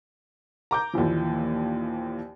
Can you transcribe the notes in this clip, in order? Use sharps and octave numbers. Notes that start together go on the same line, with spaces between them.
A#5 D6 G6
D#2 A#2 E3 F3